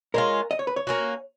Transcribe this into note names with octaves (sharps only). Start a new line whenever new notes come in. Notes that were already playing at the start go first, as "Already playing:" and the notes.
G#3 C#4 F4 A#4
D#5
C#5
B4
C#5
A#3 C#4 F#4